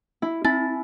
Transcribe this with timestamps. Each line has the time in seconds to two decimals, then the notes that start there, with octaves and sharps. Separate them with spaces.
0.22 E4
0.45 C4 E4 A6